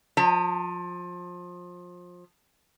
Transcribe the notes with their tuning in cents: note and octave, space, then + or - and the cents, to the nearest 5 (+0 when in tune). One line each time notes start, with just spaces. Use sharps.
F3 +25 A#5 -40